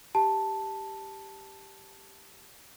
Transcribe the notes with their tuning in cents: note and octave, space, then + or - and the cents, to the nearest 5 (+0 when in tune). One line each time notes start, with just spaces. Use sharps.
G4 +0 A5 +0